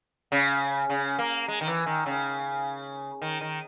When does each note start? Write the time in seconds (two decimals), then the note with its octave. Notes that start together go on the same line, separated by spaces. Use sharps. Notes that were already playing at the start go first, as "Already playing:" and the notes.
0.32 C#3
0.90 C#3
1.19 A#3
1.48 G#3
1.61 D#3
1.67 E3
1.86 D#3
2.06 C#3
3.22 D#3
3.41 D#3